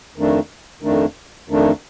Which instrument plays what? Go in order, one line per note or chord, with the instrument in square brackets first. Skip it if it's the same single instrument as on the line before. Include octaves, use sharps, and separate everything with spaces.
[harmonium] F2 D#3 A3 D4
F2 D#3 A3 D4
F2 D#3 A3 D4